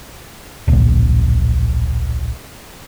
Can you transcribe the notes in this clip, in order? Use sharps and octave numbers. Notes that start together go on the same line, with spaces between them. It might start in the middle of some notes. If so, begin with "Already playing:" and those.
D1 A#1